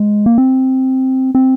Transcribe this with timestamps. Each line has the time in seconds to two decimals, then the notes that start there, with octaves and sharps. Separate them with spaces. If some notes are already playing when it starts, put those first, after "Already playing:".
Already playing: G#3
0.26 A#3
0.38 C4
1.35 C4